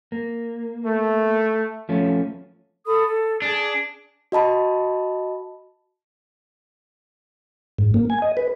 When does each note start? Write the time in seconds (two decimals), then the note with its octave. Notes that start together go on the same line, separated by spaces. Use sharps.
0.12 A#3
0.86 A3
1.89 F3 A3 C#4
2.86 A4 B5 D#6
3.06 A4
3.42 D4 G#4
4.32 F#4 D#5 A5 B5
7.79 G#2
7.94 A#3
8.10 G#5
8.22 D#5
8.37 B4